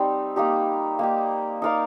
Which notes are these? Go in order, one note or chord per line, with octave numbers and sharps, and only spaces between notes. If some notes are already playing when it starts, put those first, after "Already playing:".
Already playing: G3 C4 D#4
A#3 D#4 G4
A#3 D#4 G4
D#4 A#4 D5 F5